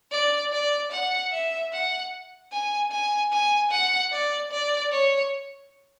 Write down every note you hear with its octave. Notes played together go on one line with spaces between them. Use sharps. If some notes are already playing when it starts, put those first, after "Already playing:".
D5
D5
F#5
E5
F#5
G#5
G#5
G#5
F#5
D5
D5
C#5